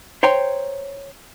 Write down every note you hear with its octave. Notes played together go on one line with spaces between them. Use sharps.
C5 C#5 G5 A#5 C6